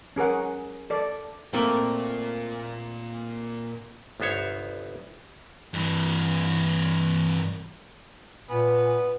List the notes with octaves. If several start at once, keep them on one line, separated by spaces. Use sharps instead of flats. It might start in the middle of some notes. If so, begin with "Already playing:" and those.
C#4 G#4 A#4 F#5
A4 D5
A#2 A3 A#3 C4 F4
G1 C2 B3 C5 C#5
G2 E3
A#2 B3 B4 G#5